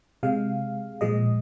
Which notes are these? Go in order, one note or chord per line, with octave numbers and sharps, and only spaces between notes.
C3 G#3 F5
A#2 F3 G#3 D#5